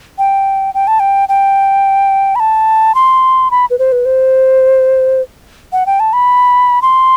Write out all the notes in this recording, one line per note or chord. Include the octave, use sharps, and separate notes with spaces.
G5
G5
A5
G5
G5
B5
A5
C6
B5
B4
C5
B4
C5
F#5
G5
A5
B5
C6